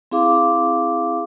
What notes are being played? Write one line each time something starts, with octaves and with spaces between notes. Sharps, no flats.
C4 E4 G#4 F5 D6